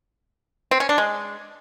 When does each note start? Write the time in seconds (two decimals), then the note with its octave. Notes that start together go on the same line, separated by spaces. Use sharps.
0.71 C4
0.80 C#4
0.89 D4
0.98 G#3